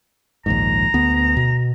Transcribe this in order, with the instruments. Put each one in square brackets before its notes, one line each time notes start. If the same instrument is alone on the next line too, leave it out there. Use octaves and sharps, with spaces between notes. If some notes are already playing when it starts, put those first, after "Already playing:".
[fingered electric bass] A#1 D#2 G#2 [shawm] A#5
[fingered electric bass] D2 B3
B2